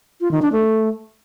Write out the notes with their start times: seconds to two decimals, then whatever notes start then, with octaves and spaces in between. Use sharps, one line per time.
0.21 F4
0.31 D#3
0.42 D4
0.53 A3